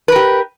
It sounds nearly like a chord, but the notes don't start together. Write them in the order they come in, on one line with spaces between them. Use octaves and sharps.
B4 A#4 G4